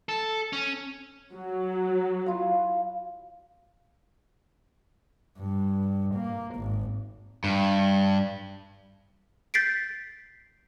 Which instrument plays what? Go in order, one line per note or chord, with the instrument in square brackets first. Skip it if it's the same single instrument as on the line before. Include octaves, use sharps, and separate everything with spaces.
[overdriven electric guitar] A4
C#4
[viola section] F#3
[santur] E4 F4 F5
[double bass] G2
A#3
G#1
[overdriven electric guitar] G2
[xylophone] G6 A6 B6 C7 D7